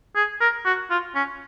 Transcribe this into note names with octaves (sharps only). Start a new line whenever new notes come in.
G#4
A#4
F#4
F4
C#4